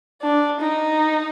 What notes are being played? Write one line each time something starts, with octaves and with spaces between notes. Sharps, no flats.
D4
D#4